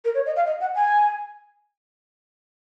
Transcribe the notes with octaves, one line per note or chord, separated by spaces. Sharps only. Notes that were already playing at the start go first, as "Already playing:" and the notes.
A#4
C#5
D#5
F5
D#5
F#5
G#5